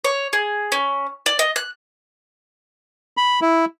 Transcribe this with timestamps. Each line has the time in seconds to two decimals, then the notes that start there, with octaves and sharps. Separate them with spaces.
0.04 C#5
0.33 G#4
0.72 C#4
1.26 D5
1.39 D#5
1.56 F#6
3.17 B5
3.42 E4